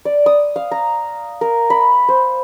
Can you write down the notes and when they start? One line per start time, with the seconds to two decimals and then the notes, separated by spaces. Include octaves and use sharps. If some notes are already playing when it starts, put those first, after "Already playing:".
0.05 D5
0.26 D#6
0.56 F5
0.71 A#5
1.41 A#4
1.70 B5
2.09 C5